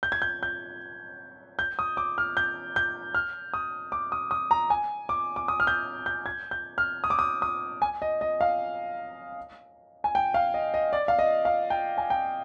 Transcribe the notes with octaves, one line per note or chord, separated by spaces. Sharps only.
G6
G#6
G6
G6
G6
D#6
D6
F6
G6
G6
F6
D#6
D6
D#6
D#6
A#5
G#5
D6
D6
D#6
F6
G6
G6
G#6
G6
F6
D#6
D6
D#6
D#6
G#5
D#5
D#5
F5
G#5
G5
F5
D#5
D#5
D5
F5
D#5
F5
G5
G#5
G5